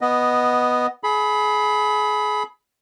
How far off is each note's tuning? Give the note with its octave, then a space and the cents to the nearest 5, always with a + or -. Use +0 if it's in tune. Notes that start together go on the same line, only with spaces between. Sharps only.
B3 +0 D#5 +0
G#4 +30 B5 +0